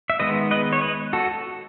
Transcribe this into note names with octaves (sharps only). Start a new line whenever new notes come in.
E5
D#3 G#3 B3 B4 D#5
B4 D#5
C#5
B4 D#5
F#4 A4